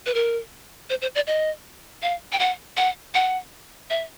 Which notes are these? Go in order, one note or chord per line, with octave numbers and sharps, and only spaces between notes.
B4
A#4
C5
C5
D5
D#5
F5
G5
F#5
F#5
F#5
E5